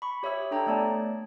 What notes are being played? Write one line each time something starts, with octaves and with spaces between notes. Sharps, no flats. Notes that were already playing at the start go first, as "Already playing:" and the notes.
B5 C#6
G4 C#5 E5 D#6 E6
D4 A4 G5 A#5
A3 B3 C#5 D5 A5